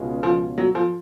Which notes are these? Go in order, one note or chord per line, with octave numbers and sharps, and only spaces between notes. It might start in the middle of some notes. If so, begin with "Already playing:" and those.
Already playing: C#2 B2 G#3 C#4 F4
F3
F#3
F3